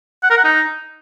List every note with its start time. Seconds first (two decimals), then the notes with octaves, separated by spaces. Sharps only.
0.23 F#5
0.30 A#4
0.37 F#5
0.44 D#4